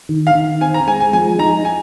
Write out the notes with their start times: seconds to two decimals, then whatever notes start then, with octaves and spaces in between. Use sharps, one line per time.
0.09 D#3
0.27 F5
0.35 D#3
0.61 C4 G#5
0.74 A#5
0.87 G#3 G#5
1.00 G#5
1.13 F3 G#5
1.39 D#4 A#5
1.65 G#5